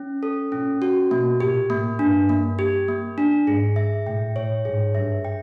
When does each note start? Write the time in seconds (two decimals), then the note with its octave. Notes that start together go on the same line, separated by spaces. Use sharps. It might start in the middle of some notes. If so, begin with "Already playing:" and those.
Already playing: C#4
0.23 A4
0.52 A#2 C#4
0.82 F#4
1.11 B2 A#3
1.40 A#2 G4
1.70 A2 A#3
1.99 G2 D4
2.29 A#3
2.59 G4
2.88 A#3
3.18 D4
3.47 G#2 G#4
3.76 E5
4.06 A2 G5
4.35 A2 C#5
4.65 G#2 G#4
4.95 G2 E5
5.25 G5